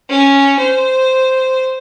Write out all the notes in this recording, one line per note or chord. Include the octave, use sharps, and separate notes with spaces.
C#4
C5